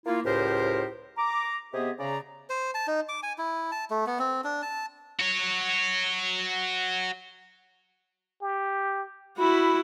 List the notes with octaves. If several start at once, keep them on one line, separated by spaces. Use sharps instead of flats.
A#3 E4 F4
C#2 A2 G4 A#4 C5
A#5 D6
C3 B3 G4 G#4 D#5 E5
C#3 D5 A#5
C5
A5
D#4
D6
G#5
E4
A5
A3
B3
C4
D4
A5
F#4 C#5
G4
E4 F#4 B5